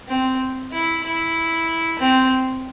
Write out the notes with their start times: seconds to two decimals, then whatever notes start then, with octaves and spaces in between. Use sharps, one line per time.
0.08 C4
0.72 E4
1.04 E4
1.99 C4